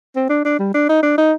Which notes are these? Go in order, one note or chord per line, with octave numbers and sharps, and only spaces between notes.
C4
D4
D4
G3
D4
D#4
D4
D#4